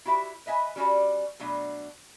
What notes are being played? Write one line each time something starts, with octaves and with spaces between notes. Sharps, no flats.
E4 F#4 G4 E5
B4 D#5 E5 G#5
G3 C#4 F#4 D5
B2 F#3 A3 D4